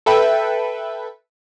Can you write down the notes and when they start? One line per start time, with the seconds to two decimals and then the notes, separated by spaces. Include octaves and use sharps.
0.06 A4 B4 E5 G5 B5